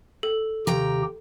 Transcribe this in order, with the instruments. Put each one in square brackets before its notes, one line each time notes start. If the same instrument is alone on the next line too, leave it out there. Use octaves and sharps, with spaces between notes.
[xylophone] A4
[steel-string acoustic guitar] D#2 G5 A#5 [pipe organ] C3 G4